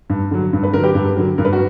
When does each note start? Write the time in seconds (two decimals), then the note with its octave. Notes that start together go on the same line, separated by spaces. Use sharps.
0.10 G2
0.31 D3 F#3
0.53 G2
0.63 B4
0.73 D3 F#3 A#4
0.83 G4 B4
0.95 G2
1.17 D3 F#3
1.38 G2 A#4
1.45 B4
1.52 F#4 A#4